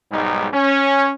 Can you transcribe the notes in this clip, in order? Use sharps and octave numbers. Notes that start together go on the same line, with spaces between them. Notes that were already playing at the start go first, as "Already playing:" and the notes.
B1 G#2 G3 G#3 D#4
C#4